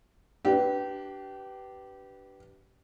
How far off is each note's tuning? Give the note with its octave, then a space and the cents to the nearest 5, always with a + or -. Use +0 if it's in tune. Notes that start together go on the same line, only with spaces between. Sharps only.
D4 +0 G4 -25 B4 +0